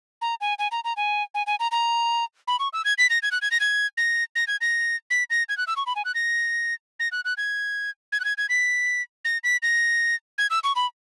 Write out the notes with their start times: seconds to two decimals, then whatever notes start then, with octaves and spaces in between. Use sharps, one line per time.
0.22 A#5
0.41 G#5
0.59 G#5
0.72 A#5
0.84 A#5
0.97 G#5
1.34 G#5
1.47 G#5
1.60 A#5
1.72 A#5
2.48 B5
2.60 C#6
2.73 E6
2.85 G#6
2.98 B6
3.10 A#6
3.23 G#6
3.32 F#6
3.42 G#6
3.51 A#6
3.60 G#6
3.97 A#6
4.36 A#6
4.48 G#6
4.61 A#6
5.10 B6
5.30 A#6
5.49 G#6
5.57 F#6
5.67 E6
5.77 C#6
5.87 B5
5.96 G#5
6.05 F#6
6.15 A#6
7.00 A#6
7.12 F#6
7.25 F#6
7.37 G#6
8.12 G#6
8.20 F#6
8.25 G#6
8.38 G#6
8.49 B6
9.25 A#6
9.44 B6
9.63 A#6
10.38 G#6
10.50 E6
10.64 C#6
10.76 B5